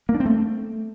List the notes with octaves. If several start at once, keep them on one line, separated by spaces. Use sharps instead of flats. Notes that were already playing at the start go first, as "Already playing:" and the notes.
A#3
D4
C4
A3